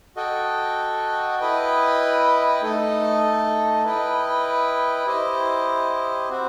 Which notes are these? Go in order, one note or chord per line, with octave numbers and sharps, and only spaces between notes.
F#4 A4 D#5 G5
E4 B4 D#5 G5
A3 D#4 A4 D#5
E4 B4 D#5 G5
E4 G4 C5 D#5
C4 F#4 C5